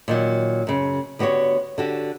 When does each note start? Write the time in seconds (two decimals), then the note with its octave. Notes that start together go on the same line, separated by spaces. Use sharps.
0.08 A#2 D#3 F#3
0.67 F#2 C#3
1.19 D3 B3 F#4 G4 C#5
1.78 D3 F#4 G4